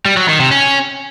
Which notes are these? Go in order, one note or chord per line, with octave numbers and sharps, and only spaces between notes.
G3
F#3
D#3
C3
C#4